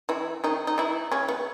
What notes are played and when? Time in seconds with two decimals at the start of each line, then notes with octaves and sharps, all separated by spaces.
0.09 E3 E4
0.44 D#3 D#4
0.67 D#4
0.78 E3 E4
1.11 C#3 C#4
1.29 B3